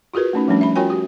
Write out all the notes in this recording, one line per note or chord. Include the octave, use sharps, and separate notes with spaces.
F4 F#4 G#4 A#4 B4
A3 C#4 D#4
F3 G3 A3 C#4 D4
E5 B5
F4 F#4 A#4 C#5 G5 G#5
F#4 G4